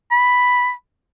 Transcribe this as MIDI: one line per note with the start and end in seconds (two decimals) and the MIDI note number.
0.11 0.72 83